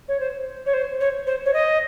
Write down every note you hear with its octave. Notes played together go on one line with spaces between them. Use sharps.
C#5
C5
C#5
C5
C#5
C5
C#5
D#5